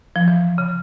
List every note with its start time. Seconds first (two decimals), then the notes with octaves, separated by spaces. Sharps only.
0.16 F3
0.28 E3
0.58 C#3